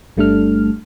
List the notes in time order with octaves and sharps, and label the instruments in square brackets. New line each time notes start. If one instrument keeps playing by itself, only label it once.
[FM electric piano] G1 G3 A3 D4 A4 F6